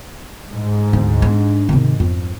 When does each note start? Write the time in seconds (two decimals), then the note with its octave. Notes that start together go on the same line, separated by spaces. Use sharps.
0.50 G#2
0.93 D2
1.22 G#3 D4
1.69 C3 D#3
2.00 F2